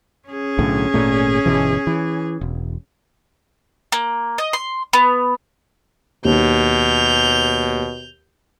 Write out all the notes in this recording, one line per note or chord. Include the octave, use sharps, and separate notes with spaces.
C#4 G#4
B1 A2 D3
G#1 A#2 A3
G1 B2 E3
E3
E1
A#3
D#5
C6
B3
D#2 B2 G6 F7